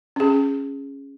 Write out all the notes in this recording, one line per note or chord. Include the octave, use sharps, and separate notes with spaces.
C#4 G#4